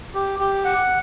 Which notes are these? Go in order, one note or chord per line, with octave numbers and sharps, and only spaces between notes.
G4
G4
F#5